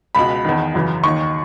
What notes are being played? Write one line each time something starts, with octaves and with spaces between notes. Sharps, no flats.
C#2 B2 B5
E2 D#3
F#2 C#3 E3
D#2 D#3 C#6